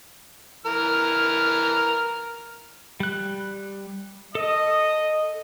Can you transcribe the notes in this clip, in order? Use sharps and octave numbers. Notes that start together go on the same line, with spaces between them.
E3 A#4 F6
G3 F#6
A4 D#5